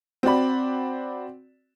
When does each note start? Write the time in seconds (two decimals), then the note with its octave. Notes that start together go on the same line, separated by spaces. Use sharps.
0.23 C4 F#4 D5 B5